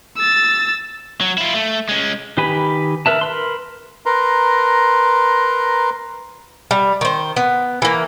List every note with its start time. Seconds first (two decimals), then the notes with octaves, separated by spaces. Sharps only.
0.18 E6 A6
1.21 F#3
1.38 E4 F4
1.54 A3
1.89 G#3 C#4
2.37 D#3 G4 B4 G#5 B5
3.06 A#4 B4 E5 A5
3.21 A#4 B4 C6
4.06 A#4 B4 A#5 C6
6.71 G3
7.01 D#3 C5
7.37 B3
7.82 E3 A#3